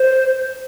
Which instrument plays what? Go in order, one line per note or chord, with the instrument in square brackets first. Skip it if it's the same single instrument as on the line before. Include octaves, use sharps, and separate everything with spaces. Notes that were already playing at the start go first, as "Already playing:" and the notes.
Already playing: [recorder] C5